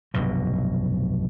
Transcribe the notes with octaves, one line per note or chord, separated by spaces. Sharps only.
F1 B1 G2 B2